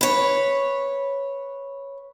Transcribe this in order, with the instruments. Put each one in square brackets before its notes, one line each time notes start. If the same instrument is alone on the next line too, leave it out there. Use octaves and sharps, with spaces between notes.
[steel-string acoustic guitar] B4 C#5